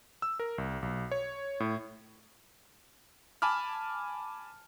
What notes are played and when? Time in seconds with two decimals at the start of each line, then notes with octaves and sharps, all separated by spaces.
0.22 E6
0.40 A#4
0.58 C2
0.82 B1
1.12 C#5
1.60 A2
3.42 G#5 A5 B5 D6 F6